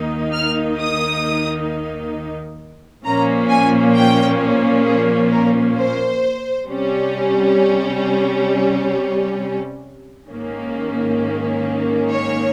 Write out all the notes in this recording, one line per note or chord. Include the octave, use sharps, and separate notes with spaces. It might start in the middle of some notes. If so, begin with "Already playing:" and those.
Already playing: D#2 D#3 A#3 D#4
F6
D#6
A#2 F3 A#3 C#4 A#5
G#5
G5
G#4
A#4
C5
C3 G3 C#4
G#2 D#3 A#3 C#4
C#5